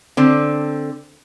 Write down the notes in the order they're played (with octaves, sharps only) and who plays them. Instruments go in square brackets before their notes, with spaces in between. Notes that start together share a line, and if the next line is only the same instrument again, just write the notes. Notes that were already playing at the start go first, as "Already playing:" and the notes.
[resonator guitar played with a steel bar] D3 C4